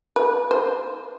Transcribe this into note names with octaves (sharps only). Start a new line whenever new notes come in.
B4
C5